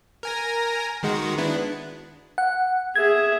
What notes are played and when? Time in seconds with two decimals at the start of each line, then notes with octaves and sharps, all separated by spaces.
0.23 A#4 G#5 A#6
1.03 D#3 G#3 F#4
1.38 B3 D4 E4
2.38 F#5
2.96 G#4 E5 G#6